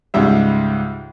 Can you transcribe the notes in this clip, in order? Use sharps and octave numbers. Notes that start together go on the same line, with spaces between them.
C#2 G#2 G3 E5